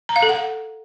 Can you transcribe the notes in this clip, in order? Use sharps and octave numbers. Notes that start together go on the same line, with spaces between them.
A#5
F5
A4
F#5